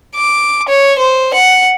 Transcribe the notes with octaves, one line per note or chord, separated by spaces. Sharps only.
D6
C#5
C5
F#5